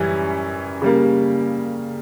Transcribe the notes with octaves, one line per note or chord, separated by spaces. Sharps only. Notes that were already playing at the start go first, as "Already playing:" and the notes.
Already playing: F#2 E3 G3 C#4 E4
C#3 G3 A#3